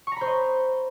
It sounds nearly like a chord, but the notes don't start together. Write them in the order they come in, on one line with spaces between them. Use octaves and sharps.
C#6 A#5 B5 C5 D#5